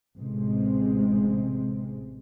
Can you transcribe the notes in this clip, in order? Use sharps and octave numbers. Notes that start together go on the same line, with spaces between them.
A1 C3 G#3 C4